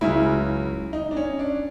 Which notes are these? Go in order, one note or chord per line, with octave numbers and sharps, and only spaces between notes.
C#2 C#3 F#3 E4
D#4
D4
C#4
D4